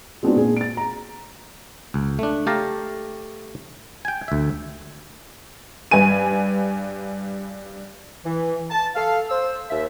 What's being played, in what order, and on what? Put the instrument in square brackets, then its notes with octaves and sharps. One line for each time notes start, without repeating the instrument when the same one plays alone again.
[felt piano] G#3 B3 C4 D4 D#4 F#4
A#2 G#4
A6 D7
A#5
[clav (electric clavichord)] C#2
A3 D4
A3 G4 F5 A5 A#5
G5 G#5
D2 E5
[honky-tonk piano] G2 B4 G#5 D#7
[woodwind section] E3
A5
A4 F5
C5 E6
D#2 E5